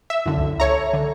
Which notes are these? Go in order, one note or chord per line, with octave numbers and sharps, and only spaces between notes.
E5
F#2 D3 E4
C#2
A4 C#5 E5 A#5
D3